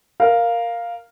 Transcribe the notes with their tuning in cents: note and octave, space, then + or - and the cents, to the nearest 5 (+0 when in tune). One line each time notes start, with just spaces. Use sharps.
A#4 +0 F5 +0